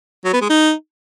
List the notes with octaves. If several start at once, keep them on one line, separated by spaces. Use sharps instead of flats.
F#3
B3
G#3
D#4